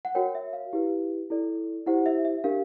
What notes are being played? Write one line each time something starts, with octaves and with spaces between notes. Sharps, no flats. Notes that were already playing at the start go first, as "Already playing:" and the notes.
F#5
F#4 A#4 C#5 G5
E5
F5
E4 G4 B4
E4 A4 D5
E4 G4 C5 F#5
E5
E5
D4 G4 A#4 F5